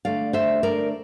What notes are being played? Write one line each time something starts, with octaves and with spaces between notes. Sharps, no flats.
D3 A3 D4 D5 F5
C5 E5
A#4 D5